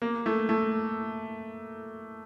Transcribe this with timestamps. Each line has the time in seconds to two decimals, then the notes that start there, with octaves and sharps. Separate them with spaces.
0.02 A#3
0.26 A3
0.49 A3